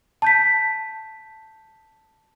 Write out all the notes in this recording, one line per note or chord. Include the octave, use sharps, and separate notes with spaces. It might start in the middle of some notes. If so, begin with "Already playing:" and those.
A5 G6 B6